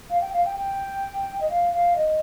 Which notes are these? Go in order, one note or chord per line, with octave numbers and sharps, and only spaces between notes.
F5
G5
F5
G5
G5
D#5
F5
F5
D#5